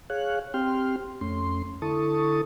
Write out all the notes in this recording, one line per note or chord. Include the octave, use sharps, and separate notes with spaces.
G#4 C#5 F5 F#6
C4 G4 G5 C6 F6
F2 A3 C#4 C6
D3 E4 A4 A5 C#6 D#6